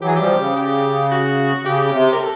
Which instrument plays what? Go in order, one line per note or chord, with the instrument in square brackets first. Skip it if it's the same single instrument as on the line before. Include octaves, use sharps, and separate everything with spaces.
[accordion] E3 F#3 [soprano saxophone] G4
[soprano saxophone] G#4
[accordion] F3 G3 [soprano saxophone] G4
[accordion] C#3
[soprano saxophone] G4
F#4
[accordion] C#3 [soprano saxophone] G4
[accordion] C3
[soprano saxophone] A#4
A4